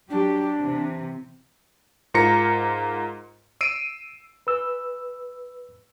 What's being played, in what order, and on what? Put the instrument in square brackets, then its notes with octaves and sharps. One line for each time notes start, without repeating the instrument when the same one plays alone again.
[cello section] F#3 G4 [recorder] D4
[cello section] C3 E3
[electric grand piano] G#2 F4 A#4 A#5 A#6 C#7
E6 C7 D7 D#7
[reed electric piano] B4 E6